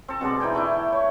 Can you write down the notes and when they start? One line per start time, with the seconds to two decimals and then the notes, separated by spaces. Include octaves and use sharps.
0.08 C4 A4
0.21 B2 G#3 D4 D5
0.40 E3 D#4 G5 G#5
0.55 A3 D4 E4
0.92 C#5